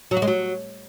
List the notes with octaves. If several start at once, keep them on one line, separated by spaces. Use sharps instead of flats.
F#3
F#4
G#3
F#3